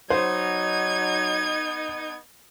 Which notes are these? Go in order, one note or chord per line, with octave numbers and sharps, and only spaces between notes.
F#3 B3 D#4 C5 G#6